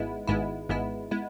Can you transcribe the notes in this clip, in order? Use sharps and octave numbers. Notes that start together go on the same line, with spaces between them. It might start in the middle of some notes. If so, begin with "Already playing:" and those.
Already playing: G#1 G#2 G#3 B3 E4
G#1 G#2 G#3 B3 E4
G#1 G#2 G#3 B3 E4
G#3 B3 E4